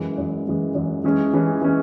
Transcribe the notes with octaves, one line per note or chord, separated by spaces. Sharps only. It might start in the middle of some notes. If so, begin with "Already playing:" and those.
Already playing: F#2 E3 G#3
F#2 E3 G#3
F#2 E3 G#3
F#2 E3 G#3
E3 G#3 C#4 G#4
E3 G#3 C#4 G#4
E3 G#3 C#4 G#4